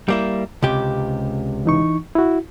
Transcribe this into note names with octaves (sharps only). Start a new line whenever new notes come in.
G3 A#3 E4
C#2 C3 G4
E3 D#4 C#6
E4 F#4